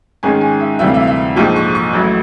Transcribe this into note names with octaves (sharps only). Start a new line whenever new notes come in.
G#2 D#3 G#3 C#4 G#5
G#5
E5
D2 C3 E3 G3 E5
F5
E5
F5
E5
A#1 G#2 F3 G5
C#6
C#6
A1 A2 F#3